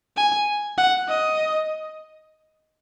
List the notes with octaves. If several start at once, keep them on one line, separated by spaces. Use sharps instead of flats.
G#5
F#5
D#5